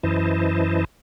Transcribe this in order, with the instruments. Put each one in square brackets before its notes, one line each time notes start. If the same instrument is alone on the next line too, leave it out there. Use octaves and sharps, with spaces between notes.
[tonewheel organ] F#2 E3 E4 C5 D#5 A5